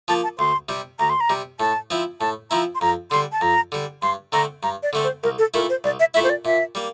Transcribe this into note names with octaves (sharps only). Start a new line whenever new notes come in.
F3 A#3 A5
A5
D2 C6
C3 G3
D2 A#5
C6
A#5
C3 G3
A2 A5
F3 C4 E4
A2 A5
F3 C4 E4 A#5
C6
F2 A#5
D3 G3 C6
A5
F2 A#5
D3 G3
G2 C6
D3 A3 C4 A#5
G2 A#5
D5
D3 A3 C4
C5
C2 A#4
A4
A#2 A3 E4 A#4
C5
C2 D5
E5
A#2 A3 E4 E5
C5
D5
A#2 E5
G3 A#3